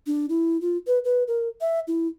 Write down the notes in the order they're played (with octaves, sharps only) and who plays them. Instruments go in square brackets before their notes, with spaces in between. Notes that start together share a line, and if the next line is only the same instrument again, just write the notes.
[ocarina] D4
E4
F4
B4
B4
A#4
E5
E4